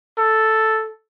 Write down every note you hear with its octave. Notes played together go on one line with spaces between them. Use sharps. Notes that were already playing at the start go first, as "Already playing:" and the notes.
A4